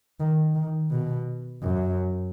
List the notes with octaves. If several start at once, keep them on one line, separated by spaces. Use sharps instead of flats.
D#3
D#3
B2
F#2